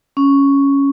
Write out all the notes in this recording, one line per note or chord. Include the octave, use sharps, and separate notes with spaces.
C#4